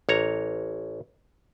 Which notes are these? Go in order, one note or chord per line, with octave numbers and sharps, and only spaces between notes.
A1 C#5 A#5